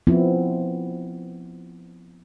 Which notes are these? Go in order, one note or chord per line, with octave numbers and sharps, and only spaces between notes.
F3 B3 C4 E4